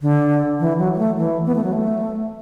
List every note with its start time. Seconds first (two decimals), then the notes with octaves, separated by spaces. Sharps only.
0.02 D3
0.60 E3
0.79 F#3
0.93 F#3
0.98 A3
1.18 E3
1.46 B3
1.55 A3
1.64 F#3
1.73 A3